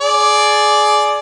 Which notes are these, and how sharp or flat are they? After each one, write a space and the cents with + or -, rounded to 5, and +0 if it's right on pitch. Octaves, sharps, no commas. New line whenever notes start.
G#4 +20 D5 +0